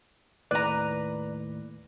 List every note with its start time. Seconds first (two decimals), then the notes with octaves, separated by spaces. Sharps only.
0.51 D#2 A2 B4 D5 A#5